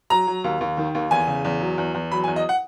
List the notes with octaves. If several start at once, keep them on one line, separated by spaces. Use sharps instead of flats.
F#3 A#5
F#3
D#2
D#2
D#3
D#2
E2 G#5
C#3
E2
F#3
E2
E2
F#3 B5
G#5
E2
D#5
F#5